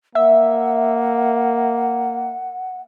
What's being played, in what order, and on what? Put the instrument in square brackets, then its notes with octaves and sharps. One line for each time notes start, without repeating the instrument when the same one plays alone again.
[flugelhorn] A#3 [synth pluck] E5 [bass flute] F#5